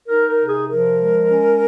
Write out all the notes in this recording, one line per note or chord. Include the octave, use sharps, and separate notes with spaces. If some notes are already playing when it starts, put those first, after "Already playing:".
D#4 A#4
A#4
C3
G#4
F3 A#4
G#3
C#4